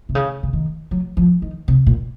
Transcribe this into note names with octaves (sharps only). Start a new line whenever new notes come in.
C3
C#3
C#3
D#3
F#3
F3
D#3
C3
A#2